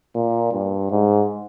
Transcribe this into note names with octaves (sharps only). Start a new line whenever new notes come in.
A#2
G2
G#2